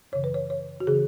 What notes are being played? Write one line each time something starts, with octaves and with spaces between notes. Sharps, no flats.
F#2 C#3 E3 C#5
B4
C#5
C#5
F#4
C#3 E3 G#4